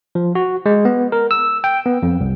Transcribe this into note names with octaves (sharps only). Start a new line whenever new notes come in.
F3
F#4
G#3
B3
A#4
E6
G5
B3
F2
C2